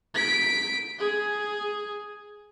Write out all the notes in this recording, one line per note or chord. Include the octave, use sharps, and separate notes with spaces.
B6 D7
G#4